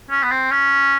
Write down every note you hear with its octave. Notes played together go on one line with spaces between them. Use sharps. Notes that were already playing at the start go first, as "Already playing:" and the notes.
C#4
B3
C4
C#4